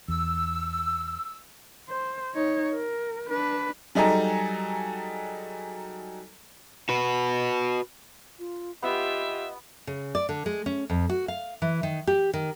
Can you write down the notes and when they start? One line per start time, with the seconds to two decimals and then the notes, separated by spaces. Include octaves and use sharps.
0.08 E2 E6
1.90 C5
2.34 D#4 C#5
2.74 A#4
3.29 D4 B4
3.95 F#3 G3 D#4 G#4 A4 A#5
6.89 F#4 B4
8.39 F4
8.82 B3 F4 G4 D#5 E5
9.87 C#3
10.15 D5
10.29 D3
10.46 G#3
10.66 C#4
10.90 F2
11.10 F#4
11.28 F5
11.62 E3
11.83 D#3
12.07 G4
12.34 D#3